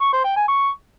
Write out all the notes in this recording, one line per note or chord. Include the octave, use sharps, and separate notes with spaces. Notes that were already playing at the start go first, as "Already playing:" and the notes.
C#6
C5
G5
G#5
C#6